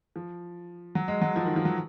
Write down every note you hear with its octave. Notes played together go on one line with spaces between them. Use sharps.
F3
F#3
G#3
F#3
F3
D#3
F3
F#3